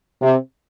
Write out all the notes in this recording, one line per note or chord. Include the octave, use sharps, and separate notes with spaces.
C3